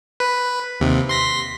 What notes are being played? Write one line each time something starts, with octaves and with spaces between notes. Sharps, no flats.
B4
D#2 C3
C6 A#6 B6